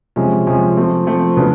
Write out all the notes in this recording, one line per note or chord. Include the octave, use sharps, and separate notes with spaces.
C3 F3 G#3 C#4
C3 F3 G#3 C#4
F3 A3 C4
F3 A3 C4
C#3 F#3 B3 D4 F#4